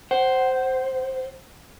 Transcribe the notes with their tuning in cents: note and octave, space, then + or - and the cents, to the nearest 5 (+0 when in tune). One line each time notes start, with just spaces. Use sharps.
C5 +0 F#5 +30